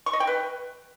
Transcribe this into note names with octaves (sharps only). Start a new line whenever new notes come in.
C#6
D#5
G5
B4